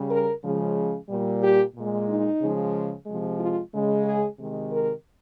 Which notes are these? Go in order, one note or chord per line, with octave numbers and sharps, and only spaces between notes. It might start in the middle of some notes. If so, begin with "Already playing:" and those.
Already playing: C#3 G3
A#4
C#3 F3 G#3
A#2 G3
G4
A#2 G#3
D#4
C#3 F3 G#3
C3 F3 G#3
F4
C#3 G#3
G#4
C3 D#3 G#3
A#4